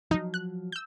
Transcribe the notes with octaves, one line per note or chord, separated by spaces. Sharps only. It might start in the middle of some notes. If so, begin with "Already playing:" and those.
F3 F#3 D#4
F#6
E6 G6